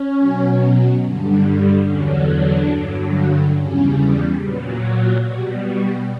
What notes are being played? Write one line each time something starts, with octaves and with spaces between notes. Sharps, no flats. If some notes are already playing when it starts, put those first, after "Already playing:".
Already playing: C#4
B2 F#3
G2 D3 G3
E2 D3 F#3 C#4
D4
G2 D3 F#3
E2 C#3 G3 C#4
A#2 F#3 B3
F#4
B2 G3 F#4
F#4